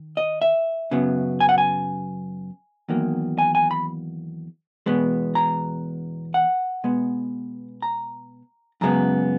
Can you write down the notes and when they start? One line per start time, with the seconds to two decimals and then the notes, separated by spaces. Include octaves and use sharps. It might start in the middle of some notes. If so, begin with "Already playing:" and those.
Already playing: D#3
0.17 D#5
0.42 E5
0.91 F#2 C#3 F#3 B3
1.40 G#5
1.49 F#5
1.58 G#5
2.89 E2 D#3 F#3 A#3
3.39 G#5
3.55 G#5
3.71 B5
4.86 E2 B2 G#3 B3
5.35 A#5
6.34 F#5
6.84 B2 G#3 B3
7.82 A#5
8.81 F#2 C#3 G#3 B3 A#5